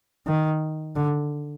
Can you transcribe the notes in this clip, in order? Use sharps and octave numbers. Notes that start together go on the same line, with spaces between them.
D#3
D3